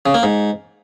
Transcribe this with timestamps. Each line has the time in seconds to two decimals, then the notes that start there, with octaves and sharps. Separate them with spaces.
0.06 C#3
0.14 A#3
0.23 G#2